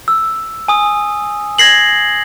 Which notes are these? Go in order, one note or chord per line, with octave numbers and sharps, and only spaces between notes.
E6
G#5 D#6
G#6 A#6 C7 F#7